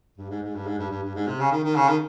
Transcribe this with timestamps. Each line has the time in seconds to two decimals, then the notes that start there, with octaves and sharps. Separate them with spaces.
0.18 G2
0.30 G#2
0.42 G#2
0.55 G2
0.66 G#2
0.79 G2
0.91 G2
1.03 G2
1.16 G#2
1.27 C3
1.40 C#3
1.52 D#3
1.64 D#3
1.76 C#3
1.88 D#3